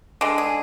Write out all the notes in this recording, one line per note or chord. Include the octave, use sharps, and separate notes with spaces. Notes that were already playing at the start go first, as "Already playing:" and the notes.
D3 G#3
G#4